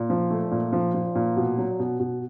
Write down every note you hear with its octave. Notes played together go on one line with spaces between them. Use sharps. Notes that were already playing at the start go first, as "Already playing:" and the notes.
Already playing: A#2
F3
A3
A#2
F3
F3
A#2
B2
F#3
B2
B2